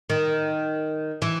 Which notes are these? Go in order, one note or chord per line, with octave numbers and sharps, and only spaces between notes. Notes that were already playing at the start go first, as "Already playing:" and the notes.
D#3
E3